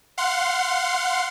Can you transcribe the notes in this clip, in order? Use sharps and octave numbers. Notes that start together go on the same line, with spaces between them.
F5 F#5 C6